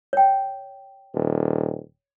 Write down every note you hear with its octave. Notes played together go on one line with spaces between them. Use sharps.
C#5 G5
D#1